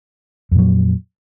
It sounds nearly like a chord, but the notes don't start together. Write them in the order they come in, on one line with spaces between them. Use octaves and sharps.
F2 A#2 F#3